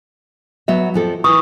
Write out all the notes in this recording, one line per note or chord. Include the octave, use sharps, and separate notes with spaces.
F#3 B3 E5
F2 F3 A4
E3 C#6 D#6